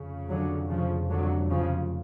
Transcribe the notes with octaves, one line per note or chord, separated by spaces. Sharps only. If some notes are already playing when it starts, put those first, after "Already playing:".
Already playing: F1 F2 C#3
D3 F#3
C#3 F3
D3 F#3
C#3 F3